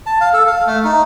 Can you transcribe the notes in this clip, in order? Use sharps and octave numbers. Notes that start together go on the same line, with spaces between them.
A5
F5
A4
F5
A3
D#4